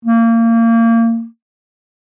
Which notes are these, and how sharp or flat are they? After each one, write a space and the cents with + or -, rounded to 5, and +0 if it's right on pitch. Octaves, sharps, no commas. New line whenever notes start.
A#3 -30